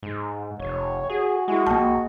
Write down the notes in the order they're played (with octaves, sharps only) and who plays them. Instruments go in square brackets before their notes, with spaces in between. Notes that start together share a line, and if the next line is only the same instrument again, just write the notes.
[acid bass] G#2
[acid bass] F1 [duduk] C#5
[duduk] F#4 [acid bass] G#4
[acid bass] G#3 [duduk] E4 [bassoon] F#4
[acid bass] A#1 [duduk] G#3 [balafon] A#3 A5